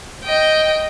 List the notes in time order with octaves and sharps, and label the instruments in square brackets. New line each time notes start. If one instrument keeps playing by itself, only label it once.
[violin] D#5 G5